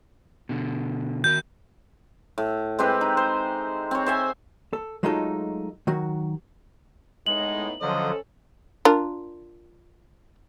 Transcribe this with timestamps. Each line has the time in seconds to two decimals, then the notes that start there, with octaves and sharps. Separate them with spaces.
0.49 B2 D3
1.24 D#3 F#4 A#4 G6
2.38 A2
2.79 G#3 C4 G4 B4
3.01 D#4
3.17 C5
3.91 C4 C#5
4.06 C5 E5 G#5
4.73 A4
5.03 F#3 G#3 A3 D#4 F4 A4
5.87 D#3 F#3 F#4
7.26 A2 G#3 B3 D#4 F#7
7.82 D3 F3 F#3 C#4 A4 C5 D#5
8.85 D4 F4 A#4